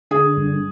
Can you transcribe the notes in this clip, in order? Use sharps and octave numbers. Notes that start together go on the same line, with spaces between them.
D3 G#4
G2